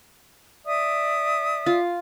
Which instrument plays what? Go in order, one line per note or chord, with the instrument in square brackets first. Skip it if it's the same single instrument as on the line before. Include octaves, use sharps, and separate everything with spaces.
[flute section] D5 E5 D#6
[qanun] F4